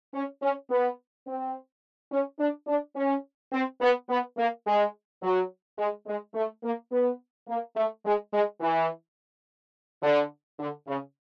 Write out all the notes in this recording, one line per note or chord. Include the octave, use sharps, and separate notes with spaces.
C#4
C#4
B3
C4
C#4
D4
D4
C#4
C4
B3
B3
A#3
G#3
F#3
G#3
G#3
A3
A#3
B3
A#3
A3
G#3
G#3
E3
D3
D3
C#3